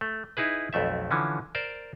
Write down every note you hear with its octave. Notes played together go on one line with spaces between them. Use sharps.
A3
D#4 E4 G#4 B4
B1 F2 A3 E5
D3 E3 F3 C#4
A#4 C5 D5